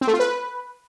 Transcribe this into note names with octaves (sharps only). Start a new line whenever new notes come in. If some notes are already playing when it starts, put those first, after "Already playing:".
C4
A3
F4
B4